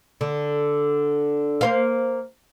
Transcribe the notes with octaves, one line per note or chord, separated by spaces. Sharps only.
D3
A#3 C5 F5